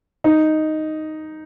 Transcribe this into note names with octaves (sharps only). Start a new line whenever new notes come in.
D#4